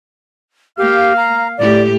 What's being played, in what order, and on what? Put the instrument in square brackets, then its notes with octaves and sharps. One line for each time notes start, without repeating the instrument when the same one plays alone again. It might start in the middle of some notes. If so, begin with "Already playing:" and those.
[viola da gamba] A#3 [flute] G4 [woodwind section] F5
[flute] A#5
[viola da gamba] A2 G4 [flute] D5